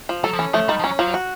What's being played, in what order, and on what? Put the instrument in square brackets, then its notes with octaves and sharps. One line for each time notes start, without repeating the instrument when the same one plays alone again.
[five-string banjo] F3
[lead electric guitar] F#3 [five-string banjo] A4
[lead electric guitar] F3
[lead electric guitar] E3 [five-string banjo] C#4
[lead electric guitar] F3 [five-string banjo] A3
[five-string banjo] D#3 [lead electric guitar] G3
[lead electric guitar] F3
[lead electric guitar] F#3 [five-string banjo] C#4
[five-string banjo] F3 [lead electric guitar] F#3
[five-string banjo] F#4